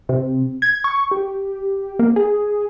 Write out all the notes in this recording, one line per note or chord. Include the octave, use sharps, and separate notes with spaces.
C3
G#6
C#6
G4
A#3
G#4